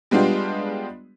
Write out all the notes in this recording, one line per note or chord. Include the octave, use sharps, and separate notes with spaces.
G3 G#3 B3 D4 F4 G4